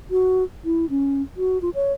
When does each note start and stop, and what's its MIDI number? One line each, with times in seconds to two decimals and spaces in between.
0.11 0.43 66
0.65 0.86 64
0.90 1.22 61
1.37 1.61 66
1.62 1.70 65
1.75 1.93 73